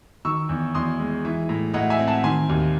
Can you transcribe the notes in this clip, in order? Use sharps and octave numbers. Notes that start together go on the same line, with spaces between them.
D#3 C#6 E6
E2
E2 C6 D#6
G#3
E3
A2
A2 D#5 F#5
E5 G#5
C4
F#5 A5
D#3 G#5 C6
D#2